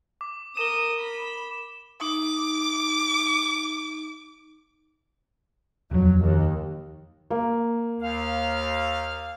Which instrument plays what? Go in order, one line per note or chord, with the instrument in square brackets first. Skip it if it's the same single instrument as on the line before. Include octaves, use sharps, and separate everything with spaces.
[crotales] D6
[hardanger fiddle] A#4 D#6 [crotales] E7 G7
[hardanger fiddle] B5
[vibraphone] D#4 [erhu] D6
[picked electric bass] D#1 F2 [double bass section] F#3
[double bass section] D#2
[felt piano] A#3
[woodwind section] D#2 F5